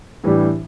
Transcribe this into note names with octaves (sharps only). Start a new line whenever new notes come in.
A2 E3 G3 D4 G4